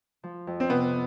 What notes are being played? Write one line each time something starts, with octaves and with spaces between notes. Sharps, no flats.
F3
F2
C4
C3 B3